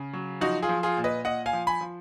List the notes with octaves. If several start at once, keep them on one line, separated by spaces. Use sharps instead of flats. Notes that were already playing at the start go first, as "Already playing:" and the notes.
Already playing: C#3
F#3
F3 D#4 F#4
F4 G#4
F3
F4 G#4
A#2
B4 D#5
A#2 D#5 F#5
F5 G#5
F3
G#5 B5
F3